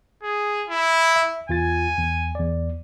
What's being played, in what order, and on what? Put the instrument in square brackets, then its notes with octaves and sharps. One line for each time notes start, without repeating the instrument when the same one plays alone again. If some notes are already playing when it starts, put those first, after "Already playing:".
[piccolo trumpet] G#4
E4
[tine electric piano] E5
[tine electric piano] E2 F4 A6 [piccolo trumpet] G#5
[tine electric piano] E2
E2 D5